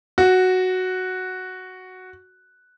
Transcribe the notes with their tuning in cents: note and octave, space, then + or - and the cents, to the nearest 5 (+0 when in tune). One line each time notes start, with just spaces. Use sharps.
F#4 +0